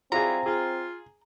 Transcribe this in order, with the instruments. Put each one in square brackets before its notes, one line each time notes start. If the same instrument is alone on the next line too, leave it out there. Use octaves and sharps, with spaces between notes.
[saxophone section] F#3 G3 E4 [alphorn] C4 [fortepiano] F4 G#4 [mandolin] A#5
[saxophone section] F4 [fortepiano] G#4